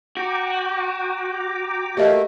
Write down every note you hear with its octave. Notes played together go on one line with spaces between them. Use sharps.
F#4 G5 A#5 D6
A3 A#3 G4 D5 D#5